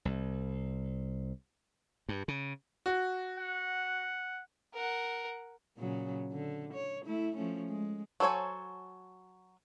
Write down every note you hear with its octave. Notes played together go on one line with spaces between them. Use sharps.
C2
G2
C#3
F#4
F#5
A#4 F#5
A#2 C#3 F#3
D3
C#5
A3 E4
F3 A3 C#4
G#3
F#3 A4 C5 C#5 G#5